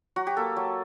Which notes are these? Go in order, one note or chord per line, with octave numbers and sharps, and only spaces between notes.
F#3 F#4
G4
A#3 A4
F#3